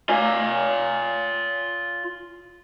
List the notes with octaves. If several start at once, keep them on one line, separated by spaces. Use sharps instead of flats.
F4 G#5